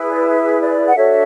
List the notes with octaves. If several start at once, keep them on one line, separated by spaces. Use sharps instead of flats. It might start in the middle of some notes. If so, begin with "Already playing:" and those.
Already playing: E4 G#4 B4
D5
E5
D5
F#5
D4 F#4 A4 C#5 E5